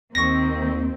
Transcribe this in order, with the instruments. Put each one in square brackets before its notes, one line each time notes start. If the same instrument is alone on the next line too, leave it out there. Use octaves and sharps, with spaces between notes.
[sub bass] D#2 [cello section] D#3 A#3 [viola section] C4 [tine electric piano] C#6 A#6